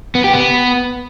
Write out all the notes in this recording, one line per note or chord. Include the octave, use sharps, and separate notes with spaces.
B3
G4
B3